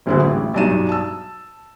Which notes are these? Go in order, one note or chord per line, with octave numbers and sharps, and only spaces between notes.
F#1 D2 A2 D3 F#4 G#4
A1
B1 G2 D4 D#4 D#7 E7
A5 E6